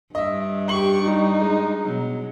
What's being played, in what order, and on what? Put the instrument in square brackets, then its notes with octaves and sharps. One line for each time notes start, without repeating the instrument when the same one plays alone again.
[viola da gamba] G2 D4 [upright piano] D#5 E5
[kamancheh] G4 C#6 [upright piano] F#7
[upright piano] G3 G4 [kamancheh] D#4
[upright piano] G#3
[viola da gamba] B2 F#3